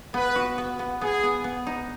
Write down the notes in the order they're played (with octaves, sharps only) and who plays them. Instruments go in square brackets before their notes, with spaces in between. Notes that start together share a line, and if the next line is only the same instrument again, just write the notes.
[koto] B3 [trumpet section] B4
[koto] F#4
B3
B3
[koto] B3 [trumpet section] G#4
[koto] B3
B3
D#4